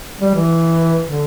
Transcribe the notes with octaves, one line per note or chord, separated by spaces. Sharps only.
G3
E3
D3